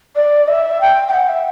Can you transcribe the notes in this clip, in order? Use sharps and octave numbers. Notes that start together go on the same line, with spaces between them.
D5
E5
G5
G5
F#5
E5